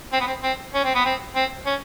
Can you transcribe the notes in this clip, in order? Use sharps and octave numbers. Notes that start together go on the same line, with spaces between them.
C4
B3
C4
C4
C#4
C4
B3
C4
C4
C#4